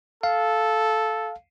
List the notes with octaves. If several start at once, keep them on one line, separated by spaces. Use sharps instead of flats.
A4 F5